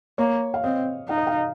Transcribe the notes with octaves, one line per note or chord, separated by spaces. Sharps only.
A#3 C#5
F5
C4 D#5
D#4 F5
D#5
F5